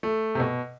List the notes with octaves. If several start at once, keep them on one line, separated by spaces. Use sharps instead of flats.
A3
C3
B2